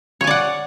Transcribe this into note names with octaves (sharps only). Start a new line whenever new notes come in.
C#5 D5 F#5 G#5